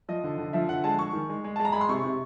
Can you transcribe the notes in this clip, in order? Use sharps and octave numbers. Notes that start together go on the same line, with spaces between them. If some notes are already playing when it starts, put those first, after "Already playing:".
F3 D#5
D3
D3
F3 E5
D3 F#5
G#3 A5
G#3 C#6
D#3
G#3
G#3
A5
G#3
A#5
G#3 B5
C6
C3 C#6
C3